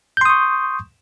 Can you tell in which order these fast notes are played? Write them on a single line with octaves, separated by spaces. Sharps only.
G6 C6 D#6 C#6